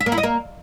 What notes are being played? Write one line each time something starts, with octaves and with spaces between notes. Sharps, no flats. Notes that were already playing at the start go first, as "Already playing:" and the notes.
E5
A#3
E4
D#5
A#3